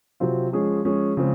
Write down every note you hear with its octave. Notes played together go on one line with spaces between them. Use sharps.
C3 F#3 C4 F4
F3 G#3 C#4 G#4
F3 G#3 C#4 G#4
C#3 F3 G#3 C4